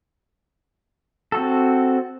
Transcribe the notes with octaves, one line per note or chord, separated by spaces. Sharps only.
C4 F#4 A4